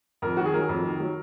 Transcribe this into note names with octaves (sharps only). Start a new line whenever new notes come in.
F2 A#4
D#3 F#4
G#4
F#3 A#4
F2
D#3
F#3